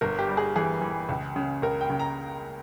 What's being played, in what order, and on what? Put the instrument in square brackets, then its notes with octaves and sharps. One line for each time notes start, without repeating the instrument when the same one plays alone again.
[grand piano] G1 A#4
G4
G3
G#4
E3 G#4
E3
C#2
C#3
C#2 A#4
G5
C#3
A#5